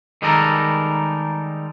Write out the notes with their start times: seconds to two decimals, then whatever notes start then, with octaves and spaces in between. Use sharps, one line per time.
0.22 D#3 G3 G#3 D#4 A4 A#4